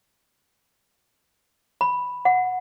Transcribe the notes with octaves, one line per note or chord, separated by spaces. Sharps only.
B5
F#5